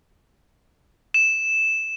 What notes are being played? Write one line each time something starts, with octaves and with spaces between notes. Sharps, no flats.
E7